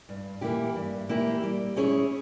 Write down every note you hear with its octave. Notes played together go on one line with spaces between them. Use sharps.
G2
E3 A#3 E4 G4
G2
E3 A#3 E4 G4
G3
C#4 E4 G#4 C#5